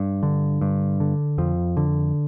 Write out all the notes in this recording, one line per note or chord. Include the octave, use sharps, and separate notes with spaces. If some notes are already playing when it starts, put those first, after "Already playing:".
Already playing: G2
D3
G2
D3
F2 F3
D3